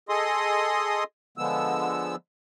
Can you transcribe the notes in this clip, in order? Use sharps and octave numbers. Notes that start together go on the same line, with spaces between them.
G#4 A4 D#5 C6 D#6
D3 F3 G#3 B3 E6